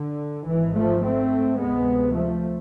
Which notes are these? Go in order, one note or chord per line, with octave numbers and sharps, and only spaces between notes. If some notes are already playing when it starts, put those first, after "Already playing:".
Already playing: D3
G#1 G#2 E3
F3 A3
A3 C4
D2 C3 G#3 B3
F3 A3